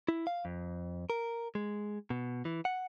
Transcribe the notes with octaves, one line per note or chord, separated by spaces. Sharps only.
E4
F5
F2
A#4
G#3
B2
E3
F#5